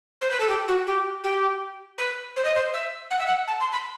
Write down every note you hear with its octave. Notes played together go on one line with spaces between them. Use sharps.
C5
B4
A4
G4
F#4
G4
G4
B4
C5
D#5
C5
E5
F#5
E5
F#5
A5
C6
B5